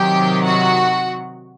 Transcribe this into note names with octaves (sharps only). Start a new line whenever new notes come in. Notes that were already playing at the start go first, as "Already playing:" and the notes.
Already playing: C3 D#3 F#3 G4 G5
F#4 F#5